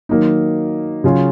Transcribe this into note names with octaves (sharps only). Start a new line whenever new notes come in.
D#3 F#3 A#3 D#4
C#3 F#3 C#4 F4 G#4